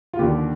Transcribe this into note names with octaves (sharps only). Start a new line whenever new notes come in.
F4
D#2 D3 G4